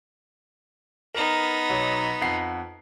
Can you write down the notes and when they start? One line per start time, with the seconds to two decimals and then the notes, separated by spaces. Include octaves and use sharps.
1.15 B3 D#4 A#4
1.70 B1 F#3
2.21 F2 F#5 C7